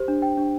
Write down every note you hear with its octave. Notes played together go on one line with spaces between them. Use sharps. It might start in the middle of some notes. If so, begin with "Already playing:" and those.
Already playing: G4 C5
D4
G5
D4